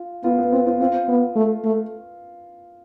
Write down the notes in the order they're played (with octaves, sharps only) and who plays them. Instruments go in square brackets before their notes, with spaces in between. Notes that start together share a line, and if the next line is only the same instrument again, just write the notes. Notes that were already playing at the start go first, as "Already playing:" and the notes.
Already playing: [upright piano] F4
[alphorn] B3 [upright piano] F4
[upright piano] B3
[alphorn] C4 [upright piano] F4
[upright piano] F4
[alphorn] C4 [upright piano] F4
[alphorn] B3
A3
A3